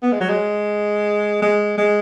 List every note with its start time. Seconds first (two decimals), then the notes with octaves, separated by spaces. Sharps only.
0.03 B3
0.12 G#3
0.21 F#3
0.29 G#3
1.42 G#3
1.78 G#3